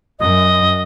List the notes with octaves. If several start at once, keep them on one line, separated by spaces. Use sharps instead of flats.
F#2 D#5